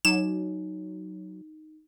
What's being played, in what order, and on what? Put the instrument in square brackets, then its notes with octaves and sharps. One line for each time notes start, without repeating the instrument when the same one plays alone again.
[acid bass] F#3 [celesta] D#4 [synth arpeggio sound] E7